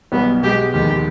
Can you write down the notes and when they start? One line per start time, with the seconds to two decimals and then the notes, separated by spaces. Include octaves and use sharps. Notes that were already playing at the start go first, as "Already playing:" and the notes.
0.12 B1 B2 G3 B3
0.42 B2 G#3 B3 G4
0.73 F1 D#2 D#3 G#3 G4